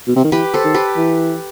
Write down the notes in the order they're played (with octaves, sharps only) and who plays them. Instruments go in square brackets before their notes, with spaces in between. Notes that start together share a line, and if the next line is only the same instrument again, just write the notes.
[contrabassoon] B2
C3
D#3
[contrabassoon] E3 [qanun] G4 B4
[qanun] A4 C5
[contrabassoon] D#3
[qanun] G4 B4
[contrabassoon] E3